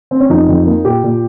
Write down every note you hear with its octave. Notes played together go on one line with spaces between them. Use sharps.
C4
C#4
F2 D#4
F2
A#3
A#2 G4
A#2